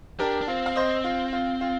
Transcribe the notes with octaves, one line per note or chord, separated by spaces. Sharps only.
D4 G4 A#4
D4
C4 F4
F5
C5 D#5
F4
F4
F4